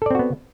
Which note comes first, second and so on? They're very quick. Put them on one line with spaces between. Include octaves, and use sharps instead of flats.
A4 D5 C4 F#4 B3